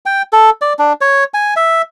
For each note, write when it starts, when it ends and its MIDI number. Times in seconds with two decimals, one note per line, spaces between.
0.06 0.22 79
0.33 0.50 69
0.61 0.73 74
0.79 0.93 62
1.01 1.24 73
1.34 1.54 80
1.56 1.82 76